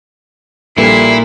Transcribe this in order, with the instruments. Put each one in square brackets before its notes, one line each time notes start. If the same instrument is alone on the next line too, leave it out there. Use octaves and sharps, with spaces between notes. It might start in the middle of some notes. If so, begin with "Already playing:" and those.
[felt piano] A#1 G3 A4 [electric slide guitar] A#2 [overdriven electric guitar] E4 [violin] C7